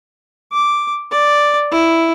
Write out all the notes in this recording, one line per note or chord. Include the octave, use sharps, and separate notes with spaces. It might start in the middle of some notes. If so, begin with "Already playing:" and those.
D6
D5
E4